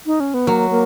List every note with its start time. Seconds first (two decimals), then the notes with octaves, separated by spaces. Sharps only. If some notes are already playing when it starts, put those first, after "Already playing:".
0.06 D#4
0.20 C#4
0.34 B3
0.47 F#3 A#3
0.70 A#3